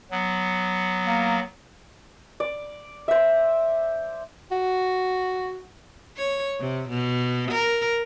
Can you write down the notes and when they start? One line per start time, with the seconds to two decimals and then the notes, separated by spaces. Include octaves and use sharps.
0.11 F#3 B3
1.07 A#3
2.40 D5
3.08 C5 E5
4.51 F#4
6.17 C#5
6.59 C3
6.89 B2
7.51 A#4